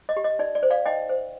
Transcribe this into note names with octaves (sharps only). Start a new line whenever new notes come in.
D#5
G4
D#5
D#4 D5
D5
C5
D5 F5
D#4 D#5 G5
C5